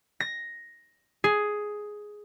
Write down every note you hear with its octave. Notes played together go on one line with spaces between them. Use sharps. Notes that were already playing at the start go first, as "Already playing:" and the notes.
A#6
G#4